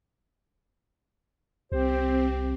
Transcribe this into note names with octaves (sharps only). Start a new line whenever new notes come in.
C2 C4 G4 C5